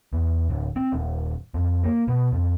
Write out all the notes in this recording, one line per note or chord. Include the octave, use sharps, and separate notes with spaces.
E2
D1
C4
D#1
F2
A#3
B2
F2